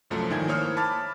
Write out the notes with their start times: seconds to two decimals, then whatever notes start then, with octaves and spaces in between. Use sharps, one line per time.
0.10 C2 F#2 F3 A3
0.30 G#1 D#3 E4 G#5 G#6
0.48 A#3 E4 C5 C#5 D#6 F6
0.77 A5 B5 D6 F6 A6